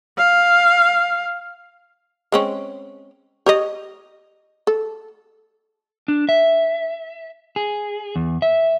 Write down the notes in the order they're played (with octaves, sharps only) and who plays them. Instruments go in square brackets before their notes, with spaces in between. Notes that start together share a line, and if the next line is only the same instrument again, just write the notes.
[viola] F5
[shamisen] G#3 C4 C#4
G4 C#5 D#5
A4
[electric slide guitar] D4
E5
G#4
E2
E5